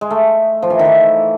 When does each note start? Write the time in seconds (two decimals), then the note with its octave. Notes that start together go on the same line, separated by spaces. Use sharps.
0.01 G#3
0.11 A3
0.62 F3
0.70 E3
0.79 D#3
0.85 E3